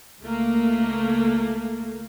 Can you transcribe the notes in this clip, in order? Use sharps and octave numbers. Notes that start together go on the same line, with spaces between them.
C#2 A3 A#3